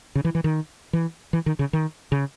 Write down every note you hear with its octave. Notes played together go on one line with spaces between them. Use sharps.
C#3
E3
E3
D#3
E3
E3
D#3
C#3
D#3
C#3